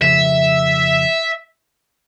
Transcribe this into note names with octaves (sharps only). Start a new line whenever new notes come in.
F2 C#3 F3 E5